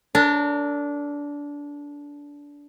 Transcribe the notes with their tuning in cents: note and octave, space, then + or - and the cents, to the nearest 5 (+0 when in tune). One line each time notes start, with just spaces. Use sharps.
D4 -20 A#4 -45